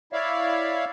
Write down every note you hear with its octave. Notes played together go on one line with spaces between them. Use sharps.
E4 C#5 D5 E5 F5